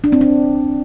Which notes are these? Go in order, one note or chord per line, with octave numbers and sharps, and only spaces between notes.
D4
C4
D4